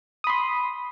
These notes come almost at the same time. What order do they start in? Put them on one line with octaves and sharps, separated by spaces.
D#6 B5 C6